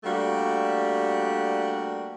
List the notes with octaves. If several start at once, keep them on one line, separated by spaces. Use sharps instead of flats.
G3 A3 A#3 D4 F#4